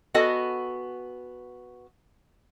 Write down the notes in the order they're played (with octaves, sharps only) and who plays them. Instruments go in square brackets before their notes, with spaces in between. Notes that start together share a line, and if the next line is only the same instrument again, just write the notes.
[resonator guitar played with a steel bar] B3 F#4 A4 D#5 G#5